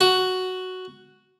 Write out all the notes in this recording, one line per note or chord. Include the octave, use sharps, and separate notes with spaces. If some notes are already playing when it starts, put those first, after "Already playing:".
F#4